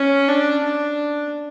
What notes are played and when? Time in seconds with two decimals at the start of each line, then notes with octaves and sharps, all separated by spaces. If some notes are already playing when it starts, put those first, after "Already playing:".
Already playing: C#4
0.28 D4
0.64 D4